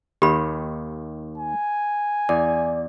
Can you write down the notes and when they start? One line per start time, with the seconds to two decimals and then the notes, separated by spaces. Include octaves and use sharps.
0.22 D#2 D#3 G4 B5
1.38 G#5
2.29 E2 D5